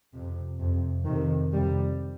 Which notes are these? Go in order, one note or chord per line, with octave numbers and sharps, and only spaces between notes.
F2 C3
F2 C3
F2 C3 D#3
F2 C3 G3